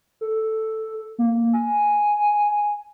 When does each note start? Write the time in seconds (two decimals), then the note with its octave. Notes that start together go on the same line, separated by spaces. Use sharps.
0.21 A4
1.18 A#3
1.53 G#5